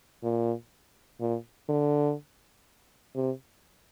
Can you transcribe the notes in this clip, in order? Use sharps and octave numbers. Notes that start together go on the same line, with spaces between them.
A#2
A#2
D3
C3